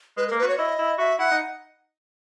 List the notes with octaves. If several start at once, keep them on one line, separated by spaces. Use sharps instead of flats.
G#3 B4
A#3 A#4
B4
F#4 C#5
E4 D#5
E4
F#4 E5
E4 F#5
D#4